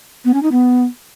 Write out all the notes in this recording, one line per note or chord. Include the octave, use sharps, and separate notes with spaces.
B3
C#4
D#4
B3